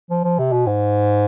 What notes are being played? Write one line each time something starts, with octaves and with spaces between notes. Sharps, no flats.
F3
F3
C3
B2
G#2